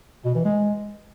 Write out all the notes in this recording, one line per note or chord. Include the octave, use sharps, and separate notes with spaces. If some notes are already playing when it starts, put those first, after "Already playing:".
B2
E3
G#3